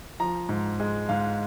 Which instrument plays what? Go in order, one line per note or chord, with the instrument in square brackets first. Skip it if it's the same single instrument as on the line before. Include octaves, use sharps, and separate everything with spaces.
[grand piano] F3 A#5
G#2
G#3
G#2 F5